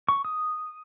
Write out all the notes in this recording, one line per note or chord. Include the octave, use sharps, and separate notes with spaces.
C#6
D#6